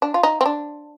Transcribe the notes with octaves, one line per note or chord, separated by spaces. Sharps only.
D4
F4
D#4
C4
D4